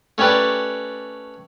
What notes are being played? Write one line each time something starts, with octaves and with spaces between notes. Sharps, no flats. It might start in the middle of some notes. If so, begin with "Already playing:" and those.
A3 C#4 G4 B4 D5